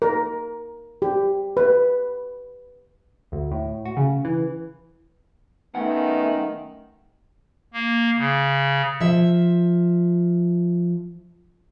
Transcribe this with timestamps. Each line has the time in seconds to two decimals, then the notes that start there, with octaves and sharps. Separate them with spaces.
0.02 A#4
1.02 G4
1.57 B4
3.32 D2
3.52 A2
3.85 F#4
3.97 C#3
4.25 E3
5.75 F#2 D#3 A3 B3 F#5
7.74 A#3
8.17 C#3
9.01 F3 E5